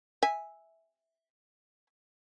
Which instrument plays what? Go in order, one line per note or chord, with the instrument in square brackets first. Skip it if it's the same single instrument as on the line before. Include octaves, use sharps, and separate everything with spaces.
[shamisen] E5 G#5